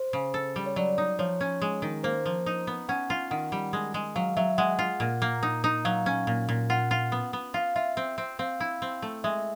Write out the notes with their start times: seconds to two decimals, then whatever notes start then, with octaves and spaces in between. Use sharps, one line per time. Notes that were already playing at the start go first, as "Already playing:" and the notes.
Already playing: C5
0.13 C#3
0.34 A4
0.56 G3
0.66 C#5
0.76 F#3 D5
0.98 D#4
1.19 F3 C#5
1.41 C#4
1.62 G#3
1.82 D#3
2.04 A#3 C5
2.26 F3
2.46 D#4
2.67 B3
2.89 C#4 F#5
3.10 F4
3.31 D#3 F#5
3.52 G3
3.73 G#3
3.94 G#3
4.16 F#3 F5
4.37 F#3 E5
4.58 G#3 F#5
4.79 F4
5.00 A#2
5.22 A#3
5.43 D#4
5.64 D#4
5.85 F#3 F5
6.06 C#4
6.27 A#2
6.49 A#2
6.70 F4 F#5
6.91 F4
7.12 B3
7.33 B3
7.54 F4 F5
7.76 F4 E5
7.97 C4
8.18 C4
8.39 C4 F5
8.60 E4
8.82 C4
9.02 A3
9.24 G#3 E5